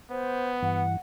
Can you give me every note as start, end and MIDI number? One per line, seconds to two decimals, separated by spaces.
0.10 0.85 59
0.10 0.49 72
0.63 0.97 43
0.63 0.97 52
0.63 0.94 78